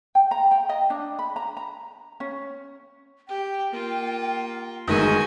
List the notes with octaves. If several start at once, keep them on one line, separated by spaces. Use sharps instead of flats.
G5
A#5
G5
D#5
D4
B5
A#5
A#5
C#4
G4 G5
A#3 F4
G1 D#3 G#3 F#4 A#4 G#5 D#6